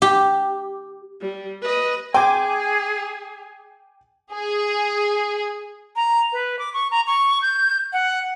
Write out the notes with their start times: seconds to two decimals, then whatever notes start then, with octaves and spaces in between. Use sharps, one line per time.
0.02 G4
1.21 G3
1.62 B4 D#5
2.14 C4 G#4 G5 G#5 D6
4.33 G#4
5.96 A#5
6.33 B4
6.59 D6
6.74 C#6
6.91 A#5
7.07 C#6
7.42 G6
7.93 F#5